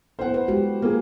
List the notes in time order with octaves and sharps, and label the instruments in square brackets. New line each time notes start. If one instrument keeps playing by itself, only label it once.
[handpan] B3 E4 A4 [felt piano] C5 F#5
[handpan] B4
G#3 F#4 G4
[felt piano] A#3 G#4 [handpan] F4